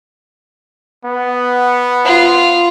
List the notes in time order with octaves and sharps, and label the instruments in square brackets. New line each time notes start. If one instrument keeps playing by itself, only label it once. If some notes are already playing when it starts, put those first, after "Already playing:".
[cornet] B3
[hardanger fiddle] F4